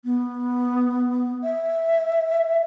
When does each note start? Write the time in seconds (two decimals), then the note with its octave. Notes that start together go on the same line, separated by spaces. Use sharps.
0.05 B3
1.43 E5